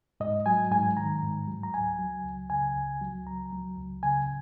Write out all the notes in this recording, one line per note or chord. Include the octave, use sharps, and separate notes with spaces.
G#2 D#5
F#3 G#5
G#2 G#5
D#3 A#5
G#2
F#3
A#5
C#2 G#5
F#3
C#2
C#3 G#5
C#2
F#3
C#2 A#5
F#3
C#2
C#3 G#5